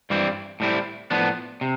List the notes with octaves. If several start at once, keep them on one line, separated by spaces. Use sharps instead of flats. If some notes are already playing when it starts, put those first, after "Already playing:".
G2 E3 G3 C4 E4
A2 G3 C4 E4
A2 F3 B3 D4
C3